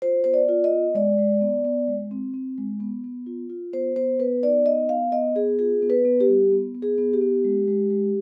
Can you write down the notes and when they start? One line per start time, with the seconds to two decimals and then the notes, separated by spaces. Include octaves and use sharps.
0.02 F4 C5
0.24 B3 C5
0.34 D5
0.49 F4
0.64 D#5
0.71 B3
0.95 G#3 D5
1.18 G#3
1.41 B3
1.65 B3
1.88 G#3
2.11 C4
2.34 C4
2.58 G#3
2.80 B3
3.04 B3
3.27 F4
3.50 F4
3.73 B3 C5
3.96 B3 C5
4.19 B3 B4
4.43 D#4 D5
4.66 B3 D#5
4.89 B3 F5
5.12 B3 D#5
5.36 B3 G#4
5.59 F4 G#4
5.82 B3
5.90 B4
6.05 B3
6.20 G4
6.29 G3
6.51 B3
6.75 B3
6.82 G#4
6.98 B3
7.14 G4
7.21 B3
7.45 G#3
7.68 G#3
7.90 G#3